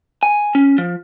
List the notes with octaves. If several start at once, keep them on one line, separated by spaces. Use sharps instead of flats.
G#5
C#4
F3